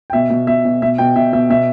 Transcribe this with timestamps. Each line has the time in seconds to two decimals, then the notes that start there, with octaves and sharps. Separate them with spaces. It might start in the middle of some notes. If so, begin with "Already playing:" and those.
0.10 G5
0.13 B2 E5
0.30 B2
0.47 B2 E5
0.65 B2
0.82 B2 E5
0.98 B2 G5
1.16 B2 E5
1.33 B2 E5
1.50 B2 E5